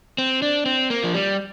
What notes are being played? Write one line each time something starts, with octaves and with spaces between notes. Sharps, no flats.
C4
D4
C4
A#3
F3
G3